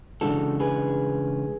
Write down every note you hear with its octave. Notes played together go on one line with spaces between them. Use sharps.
C#3 E3 G#3 D4 F#4 A4
G#4 B4